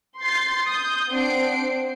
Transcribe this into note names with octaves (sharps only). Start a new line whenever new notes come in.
C6 G6 A6 C7
D#6 G6
C4 D4 F#5 C7 D7
C5